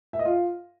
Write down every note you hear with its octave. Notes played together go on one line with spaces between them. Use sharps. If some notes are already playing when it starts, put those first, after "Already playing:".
E5
D#5
F4